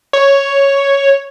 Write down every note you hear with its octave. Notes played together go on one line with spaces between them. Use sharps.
C#5